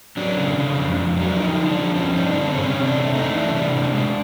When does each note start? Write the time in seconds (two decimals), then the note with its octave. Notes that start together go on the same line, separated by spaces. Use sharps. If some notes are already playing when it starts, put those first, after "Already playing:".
0.17 F#3 D4
0.37 C#3
0.57 C#3
0.77 F2
0.97 F2
1.16 F#3
1.26 D4
1.36 F3 D#4
1.56 D3
1.66 D4
1.76 F3
1.95 F3 C#4
2.15 G2 D#4
2.24 D4
2.35 D3
2.47 C4
2.54 C3 C#4
2.74 C3
2.84 D4
2.95 A3
3.14 A3 D#4
3.33 E3 D4
3.46 C#4
3.53 C3 D4
3.74 A2
3.93 G#3